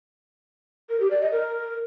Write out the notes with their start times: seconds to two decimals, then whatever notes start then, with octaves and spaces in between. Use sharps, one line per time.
0.90 A#4
1.00 G4
1.11 D5
1.21 D#5
1.32 A#4